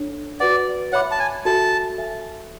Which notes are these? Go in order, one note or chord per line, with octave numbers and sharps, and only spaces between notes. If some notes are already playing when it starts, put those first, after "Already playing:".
Already playing: D4 A4 C#5
F#4 B4 D5 F#5
C#5 E5 F#5 B5 D6
A5
G#5
F#4 A4 E5 G#5 A5
A4 E5 G#5